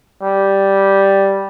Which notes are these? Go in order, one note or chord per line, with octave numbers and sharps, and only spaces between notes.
G3